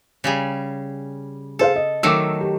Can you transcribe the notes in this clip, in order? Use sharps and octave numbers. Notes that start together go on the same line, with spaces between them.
C#3 G3 G#4
G#4 A4 C5 F5
D#5
D#3 F#3 A3 D6 E6
G4